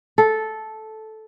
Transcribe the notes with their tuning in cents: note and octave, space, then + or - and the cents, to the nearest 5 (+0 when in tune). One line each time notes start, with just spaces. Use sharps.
A4 -10